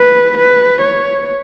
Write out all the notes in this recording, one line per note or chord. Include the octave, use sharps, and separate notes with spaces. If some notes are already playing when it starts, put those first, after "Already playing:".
Already playing: B4
B4
C#5